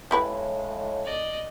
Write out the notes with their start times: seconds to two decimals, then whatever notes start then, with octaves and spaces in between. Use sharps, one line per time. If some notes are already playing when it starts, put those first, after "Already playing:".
0.11 A2 C#3 G3 G#3 E4 B4
1.05 D5 D#5